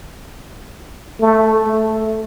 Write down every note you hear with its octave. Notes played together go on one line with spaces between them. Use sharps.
A3
A3